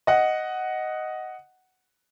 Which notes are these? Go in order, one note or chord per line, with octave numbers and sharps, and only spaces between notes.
D#5 F#5